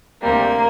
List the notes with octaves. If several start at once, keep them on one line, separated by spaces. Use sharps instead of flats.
D2 C3 G3 A#3